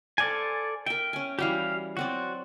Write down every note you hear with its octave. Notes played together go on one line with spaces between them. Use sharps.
A4 C5 D5 F5 G#5
A#4 E5 G5
C#4 G#5
E3 G3 F#4 G4 F5
F#3 C4 F#4 D5